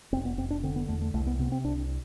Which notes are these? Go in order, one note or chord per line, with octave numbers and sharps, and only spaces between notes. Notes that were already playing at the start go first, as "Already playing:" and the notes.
F1 C4
B3
F1 C4
D4
D3 C4
B3
E2 A3
A3
C2 A3
B3
C3 B3
C4
C2 D4